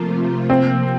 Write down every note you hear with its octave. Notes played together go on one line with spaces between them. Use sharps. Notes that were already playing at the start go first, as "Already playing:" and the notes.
Already playing: C3 F3 A3 A#3 C4 F4
C3 F3 A#3 C4